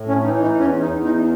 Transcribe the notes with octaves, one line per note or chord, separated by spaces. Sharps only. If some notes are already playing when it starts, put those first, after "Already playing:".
Already playing: A2
C#4
E3 D#4
D#4
E2 C#4
D#4
E2
D#4